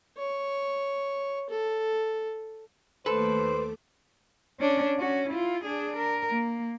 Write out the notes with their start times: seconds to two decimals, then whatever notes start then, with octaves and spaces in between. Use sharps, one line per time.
0.17 C#5
1.49 A4
3.06 D#2 A3 A4 B4 C5 D6
4.60 C#4 D4
4.98 C#4 F#4
5.29 E4 F4
5.64 D4 G#4
5.96 A#4
6.28 A#3